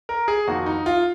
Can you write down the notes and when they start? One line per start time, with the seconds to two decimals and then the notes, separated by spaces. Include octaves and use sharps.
0.09 A#4
0.28 G#4
0.47 F2 D#3 A#3 F#4
0.66 D#4
0.86 F4